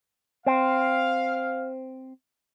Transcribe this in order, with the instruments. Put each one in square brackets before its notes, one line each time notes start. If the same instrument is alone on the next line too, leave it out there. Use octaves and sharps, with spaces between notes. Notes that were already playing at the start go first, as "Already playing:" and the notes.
[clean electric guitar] C4 [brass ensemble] F5